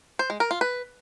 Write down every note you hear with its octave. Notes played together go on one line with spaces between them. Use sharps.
C5
G#3
A#4
F4
B4